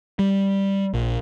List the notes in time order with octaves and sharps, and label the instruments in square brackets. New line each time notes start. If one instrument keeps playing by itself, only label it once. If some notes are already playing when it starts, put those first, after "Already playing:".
[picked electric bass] G3
A#1